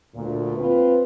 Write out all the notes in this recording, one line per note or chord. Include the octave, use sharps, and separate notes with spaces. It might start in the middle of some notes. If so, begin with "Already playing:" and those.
D2 A#2
C4 F4 B4